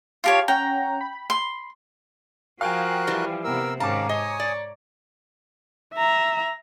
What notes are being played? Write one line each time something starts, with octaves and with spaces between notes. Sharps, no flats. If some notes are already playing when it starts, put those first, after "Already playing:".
F4 G4 C#5 F5 A5 C6
C#4 F#5 G5 A#5
B5
C6
F3 F#4 A#4 F5 G5 G#5 F#6
E3 G3
C3 B3 A#4 E6
G#2 D#3 C#4 F5 A5 A#5 D6
C#5 D#5 G#5 D#6
D5
E5 A#5